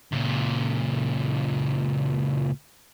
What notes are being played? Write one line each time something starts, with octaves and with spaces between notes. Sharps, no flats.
C#2 A#2